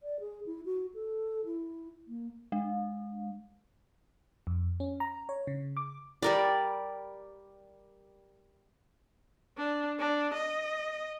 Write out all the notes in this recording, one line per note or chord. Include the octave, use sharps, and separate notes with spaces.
D5
G#4
E4
F#4
A4
E4
A#3
G#3
F2
C#4
A#5
C#5
C#3
D6
G3 A#4 D5
D4
D4
D#5